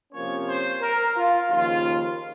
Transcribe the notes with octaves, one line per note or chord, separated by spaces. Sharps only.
C3 F3 A#3 C#4 C#5
C5
A#4
F4
D#2 C#3 F3 F4